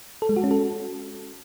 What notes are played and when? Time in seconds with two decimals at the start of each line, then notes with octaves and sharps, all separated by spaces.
0.22 A4
0.29 G#3
0.37 F#4
0.44 C#4
0.51 A4